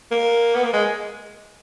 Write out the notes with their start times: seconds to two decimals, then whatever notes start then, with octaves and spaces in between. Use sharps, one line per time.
0.11 A#3
0.55 B3
0.64 A#3
0.73 G#3